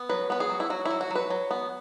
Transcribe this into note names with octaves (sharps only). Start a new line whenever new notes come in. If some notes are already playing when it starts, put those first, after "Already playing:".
Already playing: B3
F#3 B4
B3 B4
G#4
F#3
E4
F#3 F#4
E4
F#3
F#4
F#3 B4
F#3
B3